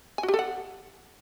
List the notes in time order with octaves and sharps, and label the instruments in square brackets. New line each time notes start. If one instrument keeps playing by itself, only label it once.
[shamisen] G#5
F#4
G4
A4
F#5